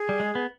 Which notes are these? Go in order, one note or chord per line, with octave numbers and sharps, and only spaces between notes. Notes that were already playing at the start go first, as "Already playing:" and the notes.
Already playing: G#4
G3
G#3
B3